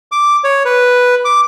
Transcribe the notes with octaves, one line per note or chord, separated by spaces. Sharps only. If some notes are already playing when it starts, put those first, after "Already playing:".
D6
C#5
B4
D6